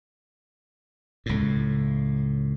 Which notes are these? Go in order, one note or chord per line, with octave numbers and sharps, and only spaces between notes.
C#2 A2